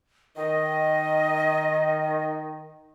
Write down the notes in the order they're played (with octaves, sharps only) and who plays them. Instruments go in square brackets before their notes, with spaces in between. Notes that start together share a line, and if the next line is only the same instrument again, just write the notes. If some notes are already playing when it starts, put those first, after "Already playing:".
[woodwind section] D#3 [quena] D#5